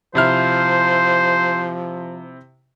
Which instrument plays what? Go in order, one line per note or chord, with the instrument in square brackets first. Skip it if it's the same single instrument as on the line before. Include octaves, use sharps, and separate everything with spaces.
[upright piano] C3 E4 F6 [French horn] F3 [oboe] C5